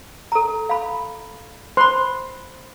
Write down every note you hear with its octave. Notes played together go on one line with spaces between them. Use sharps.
A4 A#5
F5 B5
C5 B5 C6